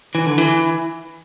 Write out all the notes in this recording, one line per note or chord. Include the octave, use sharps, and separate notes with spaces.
E3
D3
E3